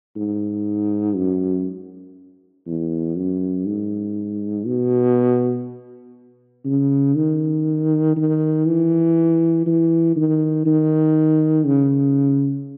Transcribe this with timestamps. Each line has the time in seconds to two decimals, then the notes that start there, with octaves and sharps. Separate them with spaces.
0.16 G#2
1.16 F#2
2.67 E2
3.16 F#2
3.66 G#2
4.66 B2
6.65 C#3
7.16 D#3
8.16 D#3
8.66 E3
9.66 E3
10.16 D#3
10.66 D#3
11.66 C#3